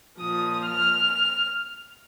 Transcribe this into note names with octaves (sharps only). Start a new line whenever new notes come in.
A#2 F3 D#6
F6